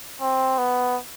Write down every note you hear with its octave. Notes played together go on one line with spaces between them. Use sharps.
C4
B3